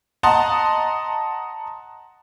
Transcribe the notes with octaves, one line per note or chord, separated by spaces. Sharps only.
D#5 F#5 A5 A#5 C6